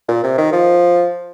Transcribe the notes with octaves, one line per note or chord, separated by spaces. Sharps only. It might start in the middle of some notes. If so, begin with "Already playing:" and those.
A#2
C3
D#3
F3